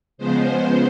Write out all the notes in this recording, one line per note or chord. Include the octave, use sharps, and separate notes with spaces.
C#3 F3 G#3 B3 C5